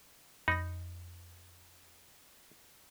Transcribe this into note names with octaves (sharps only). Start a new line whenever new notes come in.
F2 D#4 B5 D#6 A#6